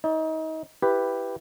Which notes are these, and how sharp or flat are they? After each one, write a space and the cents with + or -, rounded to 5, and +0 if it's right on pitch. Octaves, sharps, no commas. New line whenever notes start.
D#4 +30 D5 +0
E4 +5 G4 +0 B4 +0